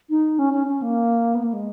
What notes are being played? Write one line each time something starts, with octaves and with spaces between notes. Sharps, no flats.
D#4
C#4
C#4
C#4
A#3
B3
A#3
G#3